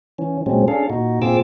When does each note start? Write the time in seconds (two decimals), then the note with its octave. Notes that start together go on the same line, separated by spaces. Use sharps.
0.18 E3 C#4
0.46 A#2 F#3 G#3 C4 C#4
0.68 C#4 D4 G#4 A4 F5
0.90 A#2 D#4 F#4
1.22 A#2 C4 F4 G#4 D6 E6